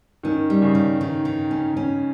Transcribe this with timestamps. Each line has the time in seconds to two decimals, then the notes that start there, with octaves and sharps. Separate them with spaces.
0.23 D#3 C#4
0.50 G3
0.62 C#3
0.75 D#3
1.01 D#3
1.25 D#3
1.51 C#4
1.77 C#4